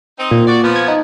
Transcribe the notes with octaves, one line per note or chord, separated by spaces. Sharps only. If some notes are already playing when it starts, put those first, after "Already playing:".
C4 D#4
A#2
F#4 D5
F3 B3
G#6
D#4